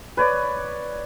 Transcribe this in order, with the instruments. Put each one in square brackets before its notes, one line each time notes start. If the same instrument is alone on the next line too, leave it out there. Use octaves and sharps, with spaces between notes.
[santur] B4 C#5 D5